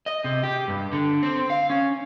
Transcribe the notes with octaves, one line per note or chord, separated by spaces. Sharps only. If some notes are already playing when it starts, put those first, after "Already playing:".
D#5
C3
G4
G2
D3
C4
F5
C#4